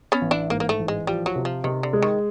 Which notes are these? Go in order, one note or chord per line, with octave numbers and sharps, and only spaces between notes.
B3 C#4
A1
D4 E4
G#2 A#3
A#3
A3
A1
G#3
F3 G3
F#3
C3
F3
C3 D#3
D3
G#3
D#3